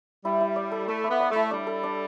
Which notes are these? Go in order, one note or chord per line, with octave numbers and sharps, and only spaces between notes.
G3 E4
E4
D5
A4
A3 A4
B3 E4
D5
A3
E4
G3 D4
A4
D4